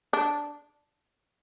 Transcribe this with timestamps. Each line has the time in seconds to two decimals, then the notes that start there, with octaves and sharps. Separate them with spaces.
0.13 D4